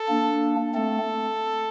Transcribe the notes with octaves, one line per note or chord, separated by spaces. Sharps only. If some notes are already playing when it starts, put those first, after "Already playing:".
Already playing: A4
A#3 D4
A3 C4 A4